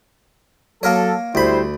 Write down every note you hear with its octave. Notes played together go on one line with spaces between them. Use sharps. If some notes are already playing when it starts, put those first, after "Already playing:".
F#3 A#3 A4 A#4 C#5
D2 G3 E4 C5 B5